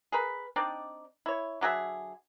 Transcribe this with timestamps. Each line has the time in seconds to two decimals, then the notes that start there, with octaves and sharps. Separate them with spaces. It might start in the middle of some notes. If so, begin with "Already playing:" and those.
0.12 G#4 A#4 B4
0.56 C4 D4 D#4 D5
1.26 E4 C#5
1.61 D3 F#3 G#4 E5